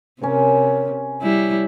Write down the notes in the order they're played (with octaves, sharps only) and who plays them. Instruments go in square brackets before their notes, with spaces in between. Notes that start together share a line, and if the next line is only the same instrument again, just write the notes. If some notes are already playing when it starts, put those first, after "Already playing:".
[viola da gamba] C3 [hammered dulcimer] C#4 A#4 C#5
[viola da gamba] G3 E4